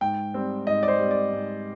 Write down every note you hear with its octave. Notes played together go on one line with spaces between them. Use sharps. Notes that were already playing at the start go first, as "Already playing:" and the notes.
G#2 G5
G3 C4
G#2 D#5
D5
C5
G3 C4
D5
G#2